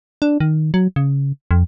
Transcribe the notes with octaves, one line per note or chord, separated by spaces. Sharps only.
D4
D#3
F#3
C#3
F2